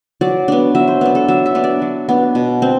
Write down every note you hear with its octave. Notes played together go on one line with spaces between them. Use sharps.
F#3 D5
B3 D4
F#3 E5
C5
B3 D4 B4
A4
F#3 E5
E5
B3 D4
D5
F#3
B3 D4
B2
C4